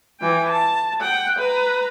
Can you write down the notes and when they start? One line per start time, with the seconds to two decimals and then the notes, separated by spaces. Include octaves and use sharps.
0.20 E3 G5
0.49 A5
1.01 F#5 G5
1.39 B4 A#5